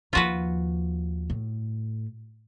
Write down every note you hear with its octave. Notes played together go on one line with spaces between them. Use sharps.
D#2 F3 F4 F#4 B4
A2